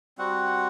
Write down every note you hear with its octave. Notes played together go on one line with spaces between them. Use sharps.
G3 C4 F#4 F#5